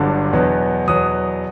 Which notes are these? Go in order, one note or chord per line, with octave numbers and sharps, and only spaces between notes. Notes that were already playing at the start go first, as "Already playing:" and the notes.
Already playing: G1 G2 D3 F#3
E2 B2 F#3 B3
E2 B2 F#3 B3 D#6